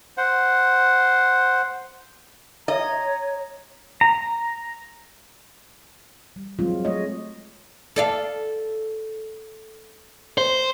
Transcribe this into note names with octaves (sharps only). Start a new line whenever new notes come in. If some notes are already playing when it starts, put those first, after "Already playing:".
C5 F#5
C#5 D#5 A#5
A#5
G3
F#3 G#3 C4 F4
G#3 A3 C#5 D#5
A4 D5 F5
C5